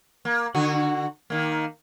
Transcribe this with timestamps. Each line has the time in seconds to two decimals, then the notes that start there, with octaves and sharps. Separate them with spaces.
0.25 A#3
0.55 D3 F#4
1.30 D#3 A#3